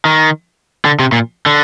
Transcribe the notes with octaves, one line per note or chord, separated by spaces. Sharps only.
D#3
D3
C3
A#2
D3